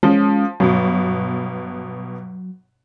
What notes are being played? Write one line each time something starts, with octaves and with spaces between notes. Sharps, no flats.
F3 G#3 C#4
G1 B2 F#3